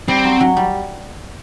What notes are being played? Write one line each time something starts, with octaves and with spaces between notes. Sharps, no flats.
G3 C4
F#3
F#3
G3